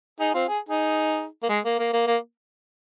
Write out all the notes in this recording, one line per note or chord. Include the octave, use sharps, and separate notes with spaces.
D#4 G#4
C4 F4
G#4
D#4 G#4
A#3
G#3
A#3
A#3
A#3
A#3